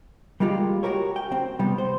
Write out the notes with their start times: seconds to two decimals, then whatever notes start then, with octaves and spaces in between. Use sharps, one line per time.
0.40 G3 G#3 A#3 F4 G4
0.83 F#4 G4 A#4 C#5
1.16 G5
1.32 C4
1.59 C3 G3 B3
1.78 C5